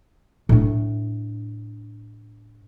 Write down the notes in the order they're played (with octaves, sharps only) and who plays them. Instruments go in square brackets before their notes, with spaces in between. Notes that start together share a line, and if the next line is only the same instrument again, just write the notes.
[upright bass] A2 D4